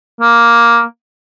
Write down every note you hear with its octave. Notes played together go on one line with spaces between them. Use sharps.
A#3